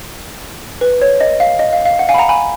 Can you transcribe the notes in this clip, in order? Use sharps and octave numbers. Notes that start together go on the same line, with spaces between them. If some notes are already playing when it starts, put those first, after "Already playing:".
B4
C#5
D#5
F5
D#5
F5
F5
F#5
F5 G#5
B5
F#5 A#5
G#5 B5